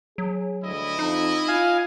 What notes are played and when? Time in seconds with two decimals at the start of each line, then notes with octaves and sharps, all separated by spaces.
0.18 F#3 G#4
0.64 D2 E4 D#5
0.99 F2 D#4
1.48 F4 F5 G#5